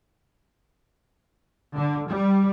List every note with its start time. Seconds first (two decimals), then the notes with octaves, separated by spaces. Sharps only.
1.74 D3
2.08 G3